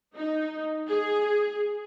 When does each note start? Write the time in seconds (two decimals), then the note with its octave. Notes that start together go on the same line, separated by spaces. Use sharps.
0.15 D#4
0.88 G#4